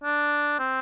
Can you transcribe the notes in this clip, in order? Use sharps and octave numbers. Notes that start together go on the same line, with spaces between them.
D4
C4